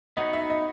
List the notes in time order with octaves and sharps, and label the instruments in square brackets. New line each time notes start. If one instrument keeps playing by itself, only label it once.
[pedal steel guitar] B3 D#4 F#4 C#5 [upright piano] D#5
[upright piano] E5
D#5